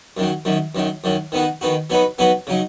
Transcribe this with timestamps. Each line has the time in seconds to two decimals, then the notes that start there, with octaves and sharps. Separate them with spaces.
0.17 F#2 D#3 F#3
0.45 F#2 D#3 F#3
0.75 F#2 D#3 F#3
1.04 F#2 D#3 F#3
1.32 D#3 B3 D#4 F#4
1.61 D#3 B3 D#4 F#4
1.90 F#3 B3 D#4 F#4 B4
2.19 F#3 B3 D#4 F#4 B4
2.47 C#3 F#3 D#4